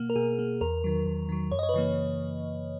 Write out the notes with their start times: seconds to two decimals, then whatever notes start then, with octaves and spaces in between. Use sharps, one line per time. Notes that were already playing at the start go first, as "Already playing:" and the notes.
Already playing: B2 A#3
0.10 A#4
0.16 B2 G#4
0.39 A#3
0.61 E2 A#4
0.84 D#3 F#3
1.06 E2
1.29 D#3 F#3
1.51 F#2 C#5
1.59 D#5
1.63 C#5
1.69 B4
1.73 C#3 E3 A#3 C#5